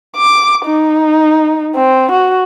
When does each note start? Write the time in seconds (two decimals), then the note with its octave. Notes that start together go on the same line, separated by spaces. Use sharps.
0.16 D6
0.65 D#4
1.75 C4
2.11 F#4